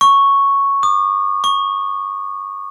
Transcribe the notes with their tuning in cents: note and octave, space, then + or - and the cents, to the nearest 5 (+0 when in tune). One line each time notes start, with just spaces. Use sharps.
C#6 +0
D6 +45
C#6 +0